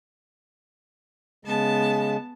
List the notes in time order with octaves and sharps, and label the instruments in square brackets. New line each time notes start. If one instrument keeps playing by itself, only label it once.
[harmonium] C#3 G#3 [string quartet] B3 A5